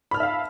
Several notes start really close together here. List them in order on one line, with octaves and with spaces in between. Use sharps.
B5 F6 A5 E5 F5